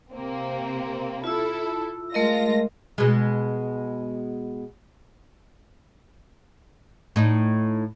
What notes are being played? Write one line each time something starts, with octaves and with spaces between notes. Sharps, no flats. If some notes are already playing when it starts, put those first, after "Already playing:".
C3 A#3 C4
E4 F4 A4 E6
G#3 A3 F4 A#4 D#5 A#6
B2 G#3
A2 D#4